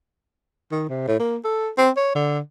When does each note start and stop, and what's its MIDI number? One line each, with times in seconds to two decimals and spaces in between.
0.71 0.85 51
0.89 1.04 48
1.08 1.17 45
1.20 1.37 58
1.44 1.69 69
1.78 1.90 60
1.97 2.11 73
2.15 2.39 50